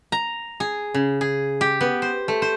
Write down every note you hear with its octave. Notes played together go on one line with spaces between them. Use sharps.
A#5
G#4
C#3
G#4
G4
B3
C5
A3
C5